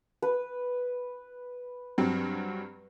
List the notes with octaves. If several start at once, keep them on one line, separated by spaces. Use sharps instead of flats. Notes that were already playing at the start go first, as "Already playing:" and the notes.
B4
G2 F#3 C4